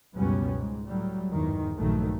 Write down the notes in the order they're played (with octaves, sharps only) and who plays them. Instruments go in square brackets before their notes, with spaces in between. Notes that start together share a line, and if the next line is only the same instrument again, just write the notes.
[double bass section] C#2 F#2 B2 G3 B3 C#4
G#2
A2 F#3 G3
G1 E2 G#2 D#3
A#1 G2 D#3 F#3 A3